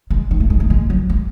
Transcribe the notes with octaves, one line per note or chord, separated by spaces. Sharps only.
G#3
D#3
A3
G#3
A3
G#3
F#3
G#3